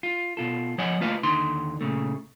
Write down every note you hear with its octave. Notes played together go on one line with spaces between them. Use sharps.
F4
B2 F4 A4
F3 C#5 D#5 F#5 G#5
A3 A#3 F4 B4 D#5 F5
D#2 D3 D#4 C6
A#2 C#3 A3